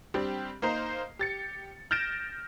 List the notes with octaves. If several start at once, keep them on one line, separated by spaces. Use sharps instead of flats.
G3 C4 D4 G4
A#3 D#4 C5 A#5 C7
G4 A6 C#7
F6 G6 A6 A#6 D7 E7